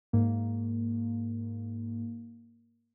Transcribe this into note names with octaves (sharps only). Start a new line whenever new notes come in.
G#2 A#3